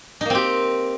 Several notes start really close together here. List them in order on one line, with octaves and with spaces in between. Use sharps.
D#4 A#3 C4 G4